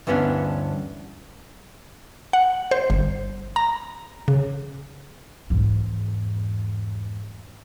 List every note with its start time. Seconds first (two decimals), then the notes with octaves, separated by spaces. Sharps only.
0.07 D2 G2 E3 B3 C#4 D4
2.33 F#5
2.71 C5
2.90 G1
3.56 A#5
4.28 C#3
5.50 E2 G#2